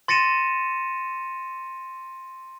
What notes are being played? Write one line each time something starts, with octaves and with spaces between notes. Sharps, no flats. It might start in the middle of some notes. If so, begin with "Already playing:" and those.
C6 A6 A#6 C#7 D#7 E7